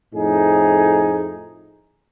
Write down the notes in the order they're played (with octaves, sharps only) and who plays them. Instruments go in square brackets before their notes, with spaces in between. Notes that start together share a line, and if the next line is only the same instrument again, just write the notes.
[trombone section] F2 A2 D#4 G#4